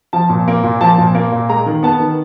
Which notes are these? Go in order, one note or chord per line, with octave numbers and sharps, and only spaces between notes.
F3 A5
A#2
A#3
A#2
F3 A5
A#2
A#3
A#2
G#3 A#5
D#3
B3 A5
D#3